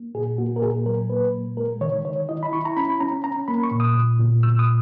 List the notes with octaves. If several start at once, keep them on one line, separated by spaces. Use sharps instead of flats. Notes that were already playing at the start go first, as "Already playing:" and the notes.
Already playing: A#3
A#2 G#4
A#3 F#4
A#4
A#2 G#4
F#3 A#4
A#3 B4
A#2
G#3 A#4
D#3 C#5
D#3 C#5
E4 D#5
B5
E4 C#6
A#5
C#4 B5
C#4 A#5
C#4 A#5
A#3 B5
C#6
A#2
D#6
A#2
A#2
A#2 E6
D#6